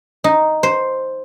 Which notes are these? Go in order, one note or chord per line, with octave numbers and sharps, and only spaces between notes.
D#4
C5